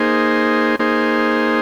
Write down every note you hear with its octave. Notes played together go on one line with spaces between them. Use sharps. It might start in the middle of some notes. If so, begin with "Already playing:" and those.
Already playing: A#3 D#4 G#4 C5
A#3 D#4 G#4 C5